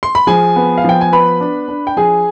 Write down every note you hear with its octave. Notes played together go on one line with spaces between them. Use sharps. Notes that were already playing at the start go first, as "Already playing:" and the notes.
C6
B5
F3 G#4 G#5
B3
F5
F3 G5
G#5
B3 B4 B5
D4
D4
G5
F3 G#4 G#5